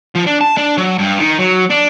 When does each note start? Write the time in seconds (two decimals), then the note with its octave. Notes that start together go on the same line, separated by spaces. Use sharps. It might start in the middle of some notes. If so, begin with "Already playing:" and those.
0.15 F3
0.26 D4
0.41 A5
0.57 D4
0.78 F#3
0.98 G2
1.18 D#3
1.38 F#3
1.70 D4